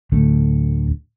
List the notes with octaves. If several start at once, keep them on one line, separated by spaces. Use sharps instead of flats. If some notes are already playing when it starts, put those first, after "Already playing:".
D1 D2 A3